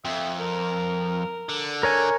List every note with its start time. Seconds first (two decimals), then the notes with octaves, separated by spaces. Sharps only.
0.05 F2 E5
0.39 A#4
1.49 D3
1.83 A#4 C#5 G#5